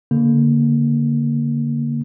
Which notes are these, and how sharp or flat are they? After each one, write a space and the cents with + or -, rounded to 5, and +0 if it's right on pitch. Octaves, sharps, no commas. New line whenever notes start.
D3 -30 A#3 +0